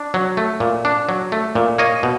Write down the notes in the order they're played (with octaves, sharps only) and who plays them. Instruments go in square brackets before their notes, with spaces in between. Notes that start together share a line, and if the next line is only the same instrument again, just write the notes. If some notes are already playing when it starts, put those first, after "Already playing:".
Already playing: [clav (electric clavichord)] D4
F#3
A3
A#2
D4
F#3
A3
A#2
A#3 C#5 D#5
B2